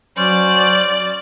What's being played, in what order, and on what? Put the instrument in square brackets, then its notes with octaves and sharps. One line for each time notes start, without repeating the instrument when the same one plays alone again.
[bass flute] F#3 [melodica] C#4 C5 [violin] D5